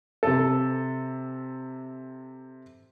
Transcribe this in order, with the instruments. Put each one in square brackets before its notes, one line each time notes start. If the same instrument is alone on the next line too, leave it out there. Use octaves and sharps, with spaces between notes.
[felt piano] C3 A4